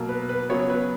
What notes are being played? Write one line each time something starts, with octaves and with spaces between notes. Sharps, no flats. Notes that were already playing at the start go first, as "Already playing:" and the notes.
Already playing: B2 F#3 A#3
B4
B4
C#3 F#3 B3 C#5
B4